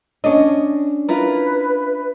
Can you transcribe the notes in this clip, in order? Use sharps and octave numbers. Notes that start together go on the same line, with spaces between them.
C#4 D4 D#5
E4 F4 A#4 B4